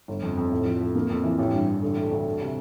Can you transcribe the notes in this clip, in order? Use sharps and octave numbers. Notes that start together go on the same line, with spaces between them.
G1
F2
F2
A2
F3
A3
A#3
F2
E3
A1
G2
A1
D3
A3
D2
A3
C3